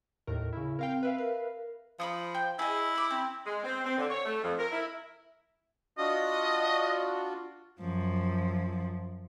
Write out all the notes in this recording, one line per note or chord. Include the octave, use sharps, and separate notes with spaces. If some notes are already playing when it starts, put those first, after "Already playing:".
D#2 A2 A#4
C#3 E4
C4 A#4 F5 G5
B4 E5 F5
A#4
F3 B5 C#6 D#6
G5
E4 G#4 D#5
B5 D6
C4
G#3
C4
C4
D3
C#5
A3
F2
A#4
E4
D4 F4 F#4 D#5
F#2 F3